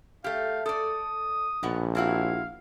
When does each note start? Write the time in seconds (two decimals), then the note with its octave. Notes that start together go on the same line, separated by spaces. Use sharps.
0.24 A3 G4 F5
0.66 A4 D5 D#6
1.63 A#1 B2 B3 F#5
1.95 C4 E4 F#4 F5